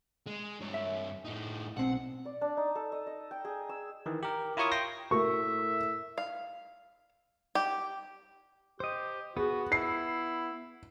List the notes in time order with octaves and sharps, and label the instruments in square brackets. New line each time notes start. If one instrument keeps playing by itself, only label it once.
[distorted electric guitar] G#3
G2 C#5
[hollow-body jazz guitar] E5
[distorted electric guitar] A2 D#4
[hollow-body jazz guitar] B1 C4 [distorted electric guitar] F#5
[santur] D5
D4
D#4
A4
D#5
D#5
G5
G#4
E6
[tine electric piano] D#3 E3
G4 A#4
E4 F4 A#4 C#5 C#6 D#6
G5 C6 A#6
[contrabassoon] A2 [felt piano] A#4 [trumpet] E5 [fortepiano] C#6
[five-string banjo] F5
G4
[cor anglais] G4 [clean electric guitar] C5 D#5
[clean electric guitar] B3 [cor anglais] F#4 [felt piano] G#4
[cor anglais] E4 [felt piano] C7